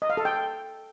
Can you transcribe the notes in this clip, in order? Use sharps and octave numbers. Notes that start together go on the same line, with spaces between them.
D#5
F5
A4
G5